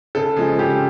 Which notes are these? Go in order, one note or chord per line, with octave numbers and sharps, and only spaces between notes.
C#3 A4
F3 G#3 G#4
C#3 G4